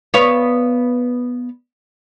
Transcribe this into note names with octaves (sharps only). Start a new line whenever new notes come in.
B3 C#5 F5